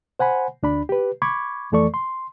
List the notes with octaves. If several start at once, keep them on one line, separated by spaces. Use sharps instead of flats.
C5 F#5 G#5 B5
D2 D4 B5
G4 B4
B5 C#6 D6 G#6
F2 E3 A3 A4 D5 C#6
C6